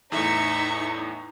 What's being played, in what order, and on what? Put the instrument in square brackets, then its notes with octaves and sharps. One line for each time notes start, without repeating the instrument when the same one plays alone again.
[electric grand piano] E2 A2 [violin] D#4 [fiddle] E5 C#6